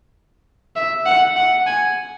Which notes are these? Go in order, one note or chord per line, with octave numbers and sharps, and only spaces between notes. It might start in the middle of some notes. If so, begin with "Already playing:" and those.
E5
F#5
F#5
G#5